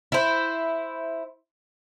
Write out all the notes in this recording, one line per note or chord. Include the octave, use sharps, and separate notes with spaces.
E4 C5